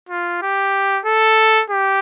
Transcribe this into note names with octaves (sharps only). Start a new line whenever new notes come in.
F4
G4
A4
G4